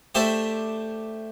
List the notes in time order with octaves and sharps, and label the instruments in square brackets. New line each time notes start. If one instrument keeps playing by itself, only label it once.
[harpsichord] A3 D4 G4 C5 E5